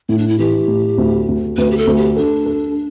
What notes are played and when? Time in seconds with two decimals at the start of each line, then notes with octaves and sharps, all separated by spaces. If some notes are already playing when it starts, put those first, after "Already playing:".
0.09 A2 E4
0.18 D4
0.28 E4
0.39 E3 G4
0.68 A2
0.98 D2
1.28 D2
1.57 D2 B4
1.71 G4
1.78 A4
1.87 D2
1.97 G4
2.16 D4 A4
2.46 A4